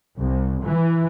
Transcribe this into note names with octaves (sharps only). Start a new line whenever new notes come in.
C2
E3